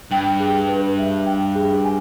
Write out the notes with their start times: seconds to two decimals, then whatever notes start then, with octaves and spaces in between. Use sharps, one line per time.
0.11 G2 G5
0.40 G#4
0.69 B4
0.98 E5
1.26 G5
1.55 G#4
1.84 G#5